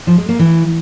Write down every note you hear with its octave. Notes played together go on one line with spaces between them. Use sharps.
F3
G#3
A#3
E3